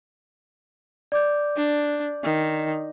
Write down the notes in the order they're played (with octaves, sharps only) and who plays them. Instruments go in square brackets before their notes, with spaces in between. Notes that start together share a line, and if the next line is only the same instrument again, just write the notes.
[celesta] D5 D6 G6
[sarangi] D4
D#3